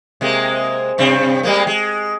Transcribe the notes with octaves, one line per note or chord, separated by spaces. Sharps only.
C3 G#3 A#3
G2 C3 C4
G3 G#3 A#3
G#3